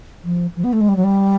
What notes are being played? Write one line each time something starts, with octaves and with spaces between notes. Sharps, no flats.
F3
F3
B3
A3
G#3
G3
F#3
G3